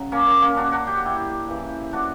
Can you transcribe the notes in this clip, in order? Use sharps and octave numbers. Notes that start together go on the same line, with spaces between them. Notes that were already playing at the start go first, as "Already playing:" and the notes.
Already playing: C#3 F#3
A#3 C#4
A#3 C#4
A#3 C#4
D4 F#4
D4 F#4
G4
F#4
E4 G4
C#3 E3
D4 F#4